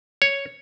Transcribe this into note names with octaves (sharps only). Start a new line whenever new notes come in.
C#5